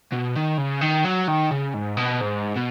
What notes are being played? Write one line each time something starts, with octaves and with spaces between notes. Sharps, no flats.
B2
D#3
C#3
D#3
F#3
D#3
C#3
G#2
B2
G#2
B2